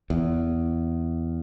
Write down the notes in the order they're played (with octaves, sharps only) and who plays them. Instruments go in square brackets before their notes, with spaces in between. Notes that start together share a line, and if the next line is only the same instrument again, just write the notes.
[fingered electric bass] E2